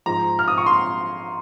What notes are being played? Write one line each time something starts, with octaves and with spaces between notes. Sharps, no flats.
G#2 F3 A#5
F6
D#6
C#6
C6